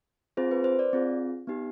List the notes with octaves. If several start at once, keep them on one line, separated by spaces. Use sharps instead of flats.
C4 F4 G#4 C5
B4
C5
D5
C4 F4 G#4
B3 D#4 G4